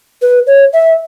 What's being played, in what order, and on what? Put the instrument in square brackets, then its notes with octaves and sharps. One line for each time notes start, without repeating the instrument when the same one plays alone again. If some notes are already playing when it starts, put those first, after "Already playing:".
[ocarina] B4
C#5
E5